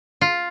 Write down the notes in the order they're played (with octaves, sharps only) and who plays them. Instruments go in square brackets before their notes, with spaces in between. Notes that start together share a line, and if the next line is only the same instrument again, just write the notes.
[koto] F4